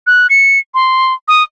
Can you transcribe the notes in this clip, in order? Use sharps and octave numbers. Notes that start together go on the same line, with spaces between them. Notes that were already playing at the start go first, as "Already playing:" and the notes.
F#6
C#7
C6
D#6